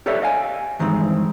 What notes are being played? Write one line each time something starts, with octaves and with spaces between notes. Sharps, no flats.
G4 A4 B4 C#5 D5 E5
D#5 F5 G#5
G2 D#3 E3 G#3 C4